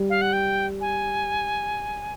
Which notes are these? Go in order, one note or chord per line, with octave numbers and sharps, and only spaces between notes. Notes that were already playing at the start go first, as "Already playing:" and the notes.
Already playing: G3
F5
F#5
G5
G#5